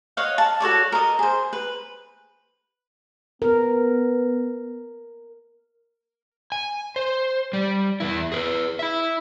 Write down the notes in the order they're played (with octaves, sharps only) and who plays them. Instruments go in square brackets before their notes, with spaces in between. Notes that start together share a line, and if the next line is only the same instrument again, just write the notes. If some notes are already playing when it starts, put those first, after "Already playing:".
[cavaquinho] C#5 D#5 F5 F#5
A5
F#4 A4 C#5 D5
A#4 D#5
G#4 C5
B4
[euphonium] B3 [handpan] A#4
[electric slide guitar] G#5
C5
G3
E2 E3 E4
G#4 A#4 B4
E4 E5